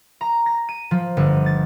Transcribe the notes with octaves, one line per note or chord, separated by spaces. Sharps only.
A#5
A#6
D#7
F3
G1
A6